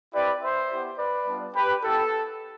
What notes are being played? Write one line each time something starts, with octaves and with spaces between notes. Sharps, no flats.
C4 E4 G4 B4 D5
C5 E5
B3 E4 G4
B4 D5
G3 B3 D4 F4
G4 B4
B3 E4 G4 A4